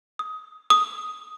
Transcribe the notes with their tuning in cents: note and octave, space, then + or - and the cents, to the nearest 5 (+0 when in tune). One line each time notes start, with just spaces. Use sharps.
D#6 +15
D#6 +5